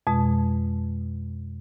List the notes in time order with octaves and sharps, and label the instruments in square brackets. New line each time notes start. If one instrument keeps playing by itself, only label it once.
[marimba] F2 B2 G#3